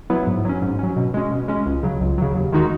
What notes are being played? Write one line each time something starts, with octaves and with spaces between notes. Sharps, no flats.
F#3 B3 E4 B4
G#2
F#3 C#4
G#2
F#3 C#4
B2
G#3 C#4
B2
G#3 C#4
C#2
C#3 F#3
C#2
C#3 F#3
D#2
D#3 G#3 D#4 F#4